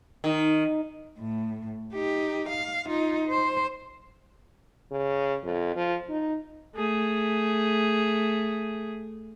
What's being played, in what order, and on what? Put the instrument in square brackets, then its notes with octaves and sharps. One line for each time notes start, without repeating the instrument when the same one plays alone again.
[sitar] D#3
[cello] A2
D#4 G4
F5
D#4 F4
C5
[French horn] C#3
F2
F3
D#4
[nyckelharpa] A3 G#4